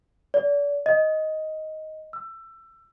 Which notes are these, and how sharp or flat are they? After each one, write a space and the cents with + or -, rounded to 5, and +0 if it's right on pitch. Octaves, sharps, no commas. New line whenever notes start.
D5 -35
D#5 +10
E6 +20